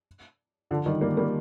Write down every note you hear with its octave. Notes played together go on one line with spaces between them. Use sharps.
D3 F3
D#3 G3
G3 A#3
G3 A#3